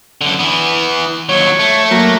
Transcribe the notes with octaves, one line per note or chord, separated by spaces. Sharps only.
F#2 D3
E3 B3
D#2 F#3 C#5
A3
F#3 A#3